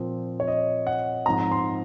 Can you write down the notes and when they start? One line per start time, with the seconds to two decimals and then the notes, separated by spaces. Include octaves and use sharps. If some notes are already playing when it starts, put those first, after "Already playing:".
Already playing: A#2 F3 C4
0.40 C#5
0.48 D#5
0.87 F#5
1.26 G#2 F3 C4 A#5
1.52 C6